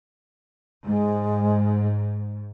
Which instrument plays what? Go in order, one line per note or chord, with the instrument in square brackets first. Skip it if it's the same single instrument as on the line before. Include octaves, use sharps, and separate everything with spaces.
[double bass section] G#2 [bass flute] G#3